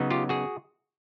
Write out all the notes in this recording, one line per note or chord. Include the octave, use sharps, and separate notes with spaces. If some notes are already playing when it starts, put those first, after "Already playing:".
Already playing: C#3 F#3 B3 D#4
F4 G4
F#4 G#4